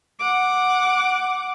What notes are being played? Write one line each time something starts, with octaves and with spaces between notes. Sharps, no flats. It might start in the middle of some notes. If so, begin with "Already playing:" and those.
F#5 D6